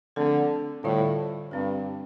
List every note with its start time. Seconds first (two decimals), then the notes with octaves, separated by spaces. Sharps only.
0.16 D3 F3 A3 C4 A4
0.84 A2 D3 G3 F4 D5
1.51 G2 G3 C4 G4